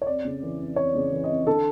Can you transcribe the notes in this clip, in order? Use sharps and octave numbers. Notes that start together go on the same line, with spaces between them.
C#5
F2 D5
C#3
E3
F2
F2 C#5
C#3
E3
D#5
F2
D3 A4